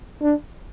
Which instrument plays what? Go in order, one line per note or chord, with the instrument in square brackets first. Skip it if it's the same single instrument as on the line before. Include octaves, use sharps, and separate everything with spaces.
[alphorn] D4